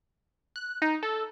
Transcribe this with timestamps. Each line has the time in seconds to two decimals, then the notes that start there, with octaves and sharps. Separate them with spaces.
0.56 F#6
0.82 D#4
1.03 A4